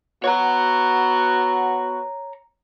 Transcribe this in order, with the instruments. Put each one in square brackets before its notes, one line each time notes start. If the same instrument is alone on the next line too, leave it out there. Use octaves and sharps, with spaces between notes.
[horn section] B3 F#4 [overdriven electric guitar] C#5 A#5